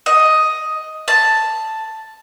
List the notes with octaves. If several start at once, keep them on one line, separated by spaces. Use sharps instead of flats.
D#5
A5